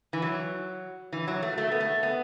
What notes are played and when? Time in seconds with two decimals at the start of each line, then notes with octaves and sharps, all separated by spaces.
0.13 E3
0.22 F#3
1.13 E3
1.27 F#3
1.42 A3
1.58 A3
1.72 B3
1.80 A3
2.03 B3